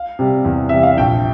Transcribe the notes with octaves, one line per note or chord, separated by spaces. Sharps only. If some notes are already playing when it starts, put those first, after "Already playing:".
Already playing: F5
C3 G3
E2
C3 G3 E5
F5
A#1 G5